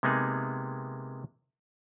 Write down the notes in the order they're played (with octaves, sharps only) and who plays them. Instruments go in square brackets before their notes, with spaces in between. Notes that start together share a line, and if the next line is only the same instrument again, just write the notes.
[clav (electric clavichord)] C3 G#3 A#3 B3 D#4 G#4